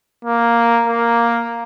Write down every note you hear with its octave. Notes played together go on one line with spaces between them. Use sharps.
A#3
A#3